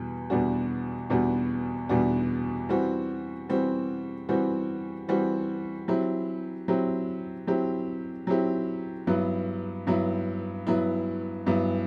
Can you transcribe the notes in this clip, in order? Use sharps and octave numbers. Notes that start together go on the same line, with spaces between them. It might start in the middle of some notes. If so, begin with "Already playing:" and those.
Already playing: E2 B2 G3
E2 B2 G3 D4 F#4
E2 B2 G3 D4 F#4
E2 B2 G3 D4 F#4
E3 G3 C4 F#4
E3 G3 C4 F#4
E3 G3 C4 F#4
E3 G3 C4 F#4
F#3 C4 E4 G4
F#3 C4 E4 G4
F#3 C4 E4 G4
F#3 C4 E4 G4
G2 F#3 B3 E4
G2 F#3 B3 E4
G2 F#3 B3 E4
G2 F#3 B3 E4